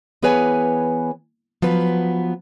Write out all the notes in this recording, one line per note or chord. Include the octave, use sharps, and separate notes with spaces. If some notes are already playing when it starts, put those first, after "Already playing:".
E3 B3 G#4 B4 C#5 G#5
F3 F#3 B3 B4